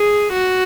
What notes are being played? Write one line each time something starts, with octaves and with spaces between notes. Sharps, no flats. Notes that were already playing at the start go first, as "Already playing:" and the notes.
Already playing: G#4
F#4